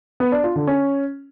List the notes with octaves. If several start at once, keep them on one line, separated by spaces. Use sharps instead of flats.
B3
D4
F4
D3
C#4